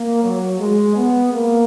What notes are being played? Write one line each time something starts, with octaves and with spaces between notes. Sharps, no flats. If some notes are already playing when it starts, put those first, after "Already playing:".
Already playing: A#3
F#3
G#3
B3
A#3